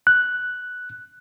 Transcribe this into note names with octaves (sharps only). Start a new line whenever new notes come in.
F#6